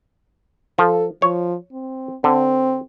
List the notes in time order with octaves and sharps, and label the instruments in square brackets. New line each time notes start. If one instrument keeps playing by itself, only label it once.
[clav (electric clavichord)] F3 [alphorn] A4
[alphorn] F3 [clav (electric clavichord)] C#5
[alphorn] C4
[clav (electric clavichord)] D3 [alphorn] C4